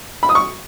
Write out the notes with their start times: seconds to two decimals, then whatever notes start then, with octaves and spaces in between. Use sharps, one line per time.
0.23 B5
0.29 D#6
0.35 C#6